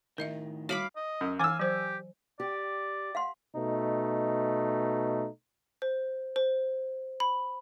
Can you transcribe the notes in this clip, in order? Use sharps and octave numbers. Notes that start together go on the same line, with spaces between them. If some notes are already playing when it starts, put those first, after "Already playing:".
A2 D#3 A#4 D#5 E5
G3 F#4 C#5 F5 B5 D6
D#5
F#2
E3 F5 G#5 D6 E6
F#3 G4 C5
G4 D5
F5 F#5 C6
B2 A3 D#4
C5
C5
B5